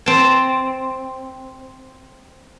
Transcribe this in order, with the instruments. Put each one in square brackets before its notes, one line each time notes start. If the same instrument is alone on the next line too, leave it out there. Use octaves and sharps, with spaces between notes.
[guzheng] C4 A5